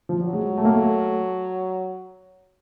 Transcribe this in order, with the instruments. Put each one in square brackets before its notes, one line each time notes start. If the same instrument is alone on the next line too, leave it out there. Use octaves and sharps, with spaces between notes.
[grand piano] F3
[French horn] F#3
[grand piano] G#3
A3
A#3
A3